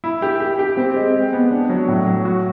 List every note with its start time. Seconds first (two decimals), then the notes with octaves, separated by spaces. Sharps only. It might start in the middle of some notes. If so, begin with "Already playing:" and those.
0.04 E4
0.22 G4
0.40 G4
0.59 G4
0.77 C4
0.96 G#3
1.14 G#3
1.33 B3
1.51 D4
1.69 F#3
1.88 A2
2.06 F#3
2.25 F#4